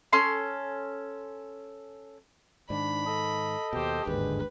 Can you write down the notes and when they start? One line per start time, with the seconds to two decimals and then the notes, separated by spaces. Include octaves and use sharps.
0.13 C#4 A4 C6
2.70 G#2 D#3 D4 B5
3.06 A4 D#5
3.73 D#2 B2 G4 C5
4.07 G1 D#2 G#2 D3 G#3 B4